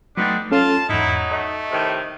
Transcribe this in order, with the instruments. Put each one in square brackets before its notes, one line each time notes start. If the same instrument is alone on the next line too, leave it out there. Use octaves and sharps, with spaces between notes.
[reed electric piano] F#3 A3 A6 [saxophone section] B3 D4 D#4 [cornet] C4
[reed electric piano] C#4 A4 [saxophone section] F4 [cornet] A5
[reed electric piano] E2 G#2 [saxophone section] F#3 D#4 [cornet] E4
[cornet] A3 [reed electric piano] D#5
[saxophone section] A2 C3 D#3